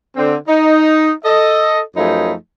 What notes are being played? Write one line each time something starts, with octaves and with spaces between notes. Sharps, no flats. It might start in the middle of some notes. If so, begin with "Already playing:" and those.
D3 C4
D#4
A4 D#5
F#2 F3 A3 D#4 G#4 B5